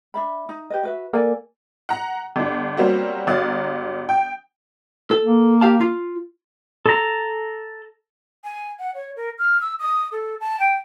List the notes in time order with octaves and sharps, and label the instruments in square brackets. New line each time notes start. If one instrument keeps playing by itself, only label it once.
[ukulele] D4 E5 B5
D#4
G4 B4 D#5
F#4 B4 E5
[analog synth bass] A#3 [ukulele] A4 D5 G#5
[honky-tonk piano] F#5 A#5
G1 D4
F#3 G3 A#3 C4 C#4 F#4
G1 F#3 F5 D#6 F#6 A6
G5
[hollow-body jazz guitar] A4
[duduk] A#3
[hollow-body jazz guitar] G4 F5 A5
F4
[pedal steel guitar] A4 A#5
[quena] G#5
F#5
C#5
A#4
F6
E6
D#6
A4
A5
G5